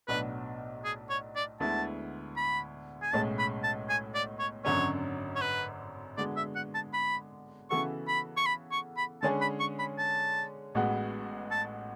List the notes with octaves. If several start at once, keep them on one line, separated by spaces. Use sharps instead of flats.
B1 A2 F#3 B3 D4 B4
G#4
C#5
D5
D2 D3 G#3 B3 E4 A5
B5
G#5
B1 A2 G#3 C#4 A5
B5
A5
G#5
D5
C#5
G#1 F#2 D3 F#3 C#4 C#5
C#5
B4
D3 G#3 B3 F#4 D5
E5
F#5
A5
B5
C#3 E3 B3 F#4 A4 C#6
B5
C#6
B5
C#6
B5
D3 G#3 C#4 G#4 C#5 A5
B5
C#6
B5
A5
A1 A2 G#3 B3 F#4
A5